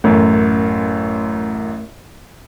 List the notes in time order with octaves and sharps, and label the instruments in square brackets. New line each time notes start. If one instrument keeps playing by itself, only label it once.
[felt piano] A1 F#2 [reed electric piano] A3 A#4